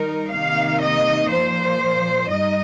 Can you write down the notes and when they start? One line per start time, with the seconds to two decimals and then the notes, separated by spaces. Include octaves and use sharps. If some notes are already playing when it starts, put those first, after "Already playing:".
Already playing: D#3 G3 D#4 A#4
0.32 C3 D#3 A#3 D#4 F5
0.81 D#5
1.31 A#2 F3 A#3 C5
2.30 G2 G3 D#4 D#5